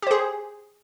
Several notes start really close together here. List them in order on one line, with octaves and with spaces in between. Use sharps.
G4 C5 G#4